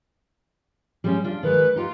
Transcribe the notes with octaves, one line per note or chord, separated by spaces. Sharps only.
G3 G#3 C#4
D4 F4
D#3 G#3 B4
D#4 F4 G4